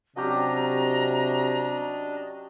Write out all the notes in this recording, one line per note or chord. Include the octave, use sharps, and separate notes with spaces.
C3 F#3 C#4 D4 G4 D#5 A#5